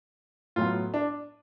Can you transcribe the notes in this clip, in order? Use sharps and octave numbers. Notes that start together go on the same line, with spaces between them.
A2 F#3 B3 F4
D4